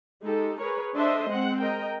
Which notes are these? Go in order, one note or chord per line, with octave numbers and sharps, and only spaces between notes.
G#3 D#4 G4 A4
G#4 A#4 B4 C#5
D4 A4 C5 D#5 E5 C6
G#3 C4 F#5
A#4 D#5 G5 A#5